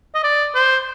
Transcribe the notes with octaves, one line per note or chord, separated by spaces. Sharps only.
D#5
D5
C5